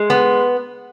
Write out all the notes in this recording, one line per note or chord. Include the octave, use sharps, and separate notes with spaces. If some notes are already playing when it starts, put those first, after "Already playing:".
Already playing: G#3
B3